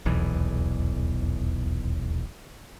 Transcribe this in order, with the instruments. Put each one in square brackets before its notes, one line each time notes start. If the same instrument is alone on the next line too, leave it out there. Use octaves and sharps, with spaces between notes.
[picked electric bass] D#1 B1 E2 E3